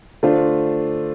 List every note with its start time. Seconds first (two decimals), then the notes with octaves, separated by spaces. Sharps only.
0.23 D3 A3 D4 F4 C5